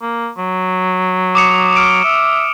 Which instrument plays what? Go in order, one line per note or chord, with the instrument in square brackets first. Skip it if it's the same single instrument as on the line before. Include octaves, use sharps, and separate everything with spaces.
[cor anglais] A#3
F#3
[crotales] D6 D#6 C#7
F6 D7
[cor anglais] E5